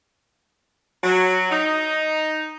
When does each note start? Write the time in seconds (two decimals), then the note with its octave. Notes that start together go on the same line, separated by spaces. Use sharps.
1.03 F#3
1.51 D#4